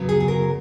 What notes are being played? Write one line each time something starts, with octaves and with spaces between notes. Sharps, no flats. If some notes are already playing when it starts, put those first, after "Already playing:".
Already playing: F#2 C#3 F#3 B3
G#4
G#4
A#4